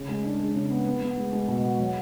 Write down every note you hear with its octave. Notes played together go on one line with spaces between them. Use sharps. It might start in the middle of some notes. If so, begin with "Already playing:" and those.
Already playing: C#3
G#3
D4
G#3
C#3
B3
B3
B3
G#3
G#3
B2
F#4
F#3